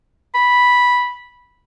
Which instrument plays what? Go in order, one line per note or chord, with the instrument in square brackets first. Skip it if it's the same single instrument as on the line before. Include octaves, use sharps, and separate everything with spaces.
[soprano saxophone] B5